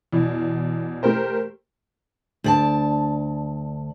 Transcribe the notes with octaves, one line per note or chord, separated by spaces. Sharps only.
E2 B2
A3 G4 A#4 C5
D2 D5 A5